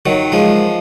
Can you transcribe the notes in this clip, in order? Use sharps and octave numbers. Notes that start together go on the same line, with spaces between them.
D#3 F#3
F3 G#3